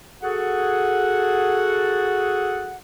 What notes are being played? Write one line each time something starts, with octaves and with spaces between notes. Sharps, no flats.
F#4 G#4 A4 F#5